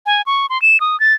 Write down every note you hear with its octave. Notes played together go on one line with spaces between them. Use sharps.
G#5
C#6
C6
E7
D#6
A6